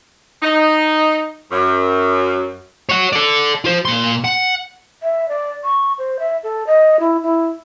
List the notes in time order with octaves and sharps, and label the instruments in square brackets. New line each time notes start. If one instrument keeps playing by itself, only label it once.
[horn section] D#4
F#2
[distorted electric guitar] C#5 F#5
A4 D5
F4 C5
A#2 C6
F#5
[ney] E5
D5
C#6
C5
E5
A4
D#5
E4
E4